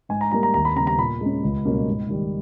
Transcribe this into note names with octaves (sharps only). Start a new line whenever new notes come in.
G#2 G#5
A#5
G3 A#3 A#5
A#5
D#2 A#5
B5
C#3 G3 B3 A#5
A#5
A#2 B5
G#3 C#4
C#2
B2 G3 A#3 C#4
G#2
D#3 G3